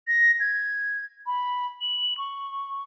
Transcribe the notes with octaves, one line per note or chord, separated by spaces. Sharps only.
A#6
G#6
B5
F#7
C#6